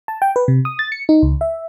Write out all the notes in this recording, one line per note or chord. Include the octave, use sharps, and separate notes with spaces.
A5
G5
B4
C3
D#6
A6
C#7
D#4
C#2
E5